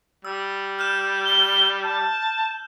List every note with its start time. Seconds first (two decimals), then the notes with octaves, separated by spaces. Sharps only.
0.25 G3 E6
0.79 F6 G6 E7
1.25 G7
1.83 A5